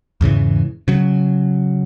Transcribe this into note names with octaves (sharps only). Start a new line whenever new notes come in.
E2 G#2 C#3 E3
C#3 F#3